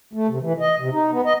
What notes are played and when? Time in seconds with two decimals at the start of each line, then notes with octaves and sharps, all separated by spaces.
0.13 A3
0.28 C3
0.40 E3
0.60 D#5
0.79 C3
0.92 D#4
1.11 B3
1.25 D#5